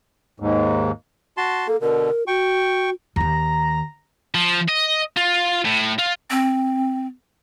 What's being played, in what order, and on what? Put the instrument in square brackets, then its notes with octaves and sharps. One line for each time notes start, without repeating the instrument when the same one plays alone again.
[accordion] D#2 G#2
[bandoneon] F#4 A5 C6
[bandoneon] A#3 [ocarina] A4
[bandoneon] B2 D3 [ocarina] A#4
[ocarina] F#4 [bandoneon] G5 C#6
[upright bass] D#2 D#3 [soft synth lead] A#5
[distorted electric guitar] F3
D#5
F4
A2
F4
[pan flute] C4